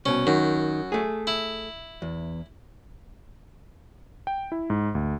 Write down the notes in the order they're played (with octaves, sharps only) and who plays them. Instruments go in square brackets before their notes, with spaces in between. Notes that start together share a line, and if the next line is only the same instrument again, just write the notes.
[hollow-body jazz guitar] C2 B2 [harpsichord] C#4
[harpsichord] F#2 [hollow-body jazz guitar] D#3
[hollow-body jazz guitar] A3 G#4
[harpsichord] E4
[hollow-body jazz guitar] E2
[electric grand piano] G5
E4
G#2
D2